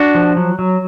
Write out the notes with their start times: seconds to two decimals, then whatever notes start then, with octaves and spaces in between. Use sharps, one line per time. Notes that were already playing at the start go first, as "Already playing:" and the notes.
Already playing: D4 F#4
0.15 F3
0.37 F#3
0.59 F#3